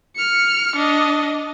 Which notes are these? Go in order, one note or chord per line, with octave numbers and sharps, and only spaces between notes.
F6 C#7
D4 D#5